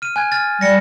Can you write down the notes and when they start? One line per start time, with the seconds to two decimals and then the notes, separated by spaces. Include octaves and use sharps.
0.02 F6 D#7
0.16 G#5 F#6 G#6
0.32 F6 A6
0.61 G3 A#6 C#7